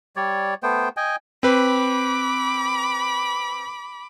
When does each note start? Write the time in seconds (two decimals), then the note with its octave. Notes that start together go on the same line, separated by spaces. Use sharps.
0.16 G3 C#5 D5
0.63 A3 B3 C5 G5
0.97 D#5 G5 G#5
1.43 C4 B4 B5 D6